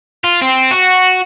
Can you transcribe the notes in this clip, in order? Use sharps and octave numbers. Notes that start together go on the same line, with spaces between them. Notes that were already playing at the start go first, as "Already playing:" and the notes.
F4
C4
F#4